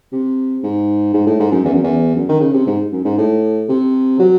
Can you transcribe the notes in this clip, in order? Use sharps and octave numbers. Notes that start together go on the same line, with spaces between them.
C3
G#2
G#2
A2
G#2
F#2
E2
F#2
E2
F#2
D#3
C#3
C3
G#2
F#2
G#2
A2
C3
F#3